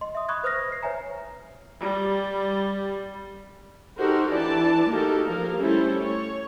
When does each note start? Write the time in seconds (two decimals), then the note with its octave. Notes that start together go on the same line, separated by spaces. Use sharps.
0.01 D#5 C6
0.15 E5 D#6
0.28 B5 C#6 D#6 F#6 G#6
0.43 B4 C5 D#6 F6 A#6
0.71 C5 C7
0.83 B4 C#5 E5 G#5 A#5
1.82 G3
3.98 D#4 F#4 G4 A4 A#4 C5
4.29 E3 D4 D5 A5
4.89 A#3 D#4 F#4 G4 A4 A#4
5.26 F3 A#3 A#4 F5
5.57 G3 A3 C#4 E4 A4 C5
6.01 C#5